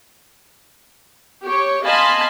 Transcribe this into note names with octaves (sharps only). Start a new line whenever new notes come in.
G4 C#5
D#5 F5 G#5 A5 B5 C6